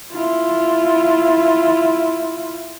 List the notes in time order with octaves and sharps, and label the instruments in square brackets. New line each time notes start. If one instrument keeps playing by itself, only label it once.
[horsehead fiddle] E4 F4